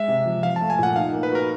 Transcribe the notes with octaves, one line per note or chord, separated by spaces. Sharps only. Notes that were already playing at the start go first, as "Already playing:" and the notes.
Already playing: G#3 E5
C3
F3
F3 F5
A5
A3
G#5
A#2 F#5
D#4 F5
A#3
B4
F#4 A#4